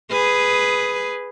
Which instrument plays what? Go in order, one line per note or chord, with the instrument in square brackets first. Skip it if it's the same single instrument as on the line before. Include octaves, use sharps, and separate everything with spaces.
[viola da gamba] G#4 B4